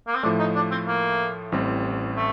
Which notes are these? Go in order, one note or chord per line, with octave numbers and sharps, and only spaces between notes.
A#3
C4
A2 F3 A3 D4
D#4
D4
C4
A#3
A1 A2 G3 C4
A3